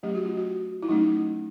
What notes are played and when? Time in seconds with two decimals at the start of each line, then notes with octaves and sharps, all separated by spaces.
0.03 F#3 A3 C#4 G4
0.15 F#4
0.25 F4
0.37 F#4
0.83 E4
0.89 F#3 A3 C#4 D#4